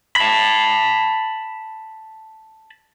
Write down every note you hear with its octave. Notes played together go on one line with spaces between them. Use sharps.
A5 B5